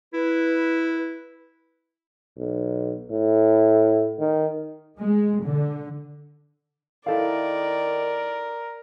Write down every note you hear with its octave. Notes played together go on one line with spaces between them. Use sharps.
E4 B4
B1
A2
D#3
G#3
D3
D#3 E4 A4 A#4 D5 F5